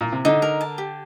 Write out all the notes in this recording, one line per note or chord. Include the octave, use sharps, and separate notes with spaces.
A#2
C3
D3 D#4
A#4
A5
G4